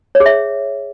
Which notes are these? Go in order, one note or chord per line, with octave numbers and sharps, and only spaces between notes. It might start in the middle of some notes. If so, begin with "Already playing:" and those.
C#5
G#4
E5